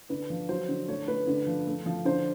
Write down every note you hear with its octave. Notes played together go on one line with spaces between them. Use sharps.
D3 B4
F3
F#3 C5
D3
A3 C#5
A3 B4
D3
F3
A3
F3
D3 C5